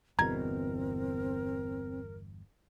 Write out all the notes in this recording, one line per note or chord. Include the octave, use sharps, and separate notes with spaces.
G1 E2 B2 C4 A#4 A#5 G#6